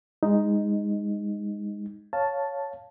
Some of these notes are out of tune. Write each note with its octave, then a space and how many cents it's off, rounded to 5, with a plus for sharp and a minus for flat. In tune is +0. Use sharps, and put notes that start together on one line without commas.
G#3 -20 D#4 +0
C#5 +5 F5 +5 A5 +0